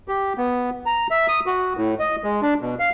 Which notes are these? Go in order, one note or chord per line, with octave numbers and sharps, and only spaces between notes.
G4
B3
A#5
E5
D#6
F#4
A2
D#5
G#3
D4
B2
F5